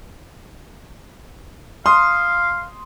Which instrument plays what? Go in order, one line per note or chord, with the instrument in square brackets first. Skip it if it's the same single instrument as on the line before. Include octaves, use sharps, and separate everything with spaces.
[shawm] F5 [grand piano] C6 D#6